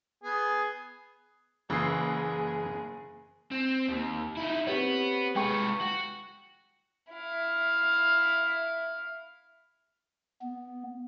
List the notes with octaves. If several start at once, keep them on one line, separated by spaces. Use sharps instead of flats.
B3 G#4
F#1 C#3 E3 G#4 C7
C4
D#2
D#4 E4
B3 C4 G4 C#5
G#3 B4 G5 C#6 C#7
F#4
E4 F5
B3